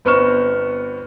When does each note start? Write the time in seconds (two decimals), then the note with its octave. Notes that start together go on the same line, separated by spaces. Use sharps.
0.05 G1 B3 C4 C#6 F6 E7